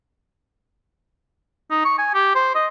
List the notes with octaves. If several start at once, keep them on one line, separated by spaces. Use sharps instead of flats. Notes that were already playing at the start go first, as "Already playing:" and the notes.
D#4
C#6
G#5
G4
C5
D#5